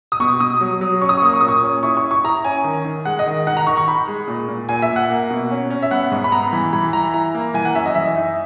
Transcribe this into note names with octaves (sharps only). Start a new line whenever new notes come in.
D#6
B2 C#6
B2 D#6
F#3
F#3
C#4 C#6
D#6
C#6
A#3 D#6
C#6
A#2 D#6
C#6
C#4
E4 C#6
C#6
E4
C#6
E4 A#5
C#4 G#5
D#3
D#3
G#3 F#5
D#5
D#3
D#3 F#5
A#5
D#3 C#6
C#6
D#4 B5
G#3
A#2
A#2
A#2 G#5
E5
A#2
F#5
A#3
B2
C#4
C#4
E5
B3 F#5
G#2
B5
B3 A#5
E3 B5
E3 B5
E3 A#5
E4 A#5
A#3
E3 G#5
F#5
F#2 E5
D#5
E3 E5
D#4